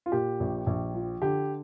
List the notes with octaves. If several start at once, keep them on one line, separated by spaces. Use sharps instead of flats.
F4
A#2 G4
A#1
A#1
F3
D3 G4